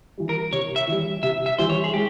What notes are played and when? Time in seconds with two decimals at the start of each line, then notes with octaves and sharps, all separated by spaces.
0.18 E3 G3
0.29 A#4
0.52 C3 C#5
0.76 E5
0.88 E3 G3
1.23 C3 E5
1.46 E5
1.58 E3 G3 C5
1.70 C#5
1.84 G#4
1.94 G#3 G4